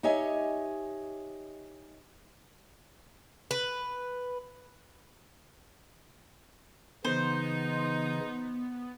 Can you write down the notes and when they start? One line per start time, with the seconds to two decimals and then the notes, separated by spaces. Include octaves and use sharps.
0.03 D#4 G4 C#5 D#5 E5 G#5
3.51 B4
7.05 C#3 E3 B3 D#4 C5